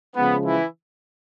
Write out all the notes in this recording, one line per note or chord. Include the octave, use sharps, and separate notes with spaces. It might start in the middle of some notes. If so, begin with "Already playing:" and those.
C#3 F3 G#3 B3
E3 E4